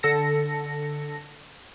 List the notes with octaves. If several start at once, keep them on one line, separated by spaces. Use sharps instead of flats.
D3 A4 A5 A#6 C#7